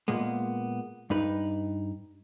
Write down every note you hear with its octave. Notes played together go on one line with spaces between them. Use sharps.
A#2 G#3 A#3 B3
G2 D#4 B4